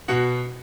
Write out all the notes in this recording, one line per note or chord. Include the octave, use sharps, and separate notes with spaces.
B2 F#4 F#5